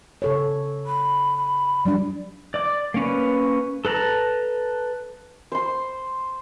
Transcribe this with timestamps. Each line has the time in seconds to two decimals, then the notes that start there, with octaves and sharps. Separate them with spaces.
0.22 C#3 A4 C#5
0.86 B5
1.85 F#3 G3 D4 D5
2.54 D5 D6
2.94 A#3 C#4 B4
3.85 A4 B4 A5 A#5
5.52 C5 C6